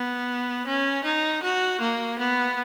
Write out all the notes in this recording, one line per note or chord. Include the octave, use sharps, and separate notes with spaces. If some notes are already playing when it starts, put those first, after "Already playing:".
Already playing: B3
C#4
D#4
F#4
A#3
B3